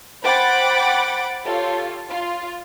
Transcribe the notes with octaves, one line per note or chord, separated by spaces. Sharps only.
C5 F#5 G5 B5 D6 A6
F4 G4 A4 C#5
F4